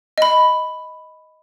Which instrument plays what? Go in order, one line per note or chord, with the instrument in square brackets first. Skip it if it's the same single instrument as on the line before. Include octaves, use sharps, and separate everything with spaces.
[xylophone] D#5 B5